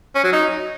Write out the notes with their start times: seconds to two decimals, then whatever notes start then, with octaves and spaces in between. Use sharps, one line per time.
0.15 C#4
0.24 F#3
0.33 D#4